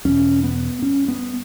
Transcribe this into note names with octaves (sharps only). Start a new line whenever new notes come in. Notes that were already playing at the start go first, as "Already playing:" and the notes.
E2 B2 C#4
B3
G2 C#4
B3